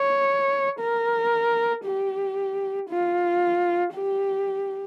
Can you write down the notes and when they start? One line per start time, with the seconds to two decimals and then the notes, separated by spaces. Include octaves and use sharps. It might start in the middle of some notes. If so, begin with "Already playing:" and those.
Already playing: C#5
0.80 A#4
1.85 G4
2.90 F4
3.94 G4